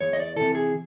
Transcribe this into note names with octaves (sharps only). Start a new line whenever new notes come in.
E2 C#5
D#5
D5
C3 E3 A4
G#4